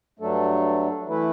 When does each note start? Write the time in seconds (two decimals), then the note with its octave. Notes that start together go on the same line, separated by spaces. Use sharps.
0.19 G2 F#3 A3 D4 A4
1.06 E3 A3 E4 B4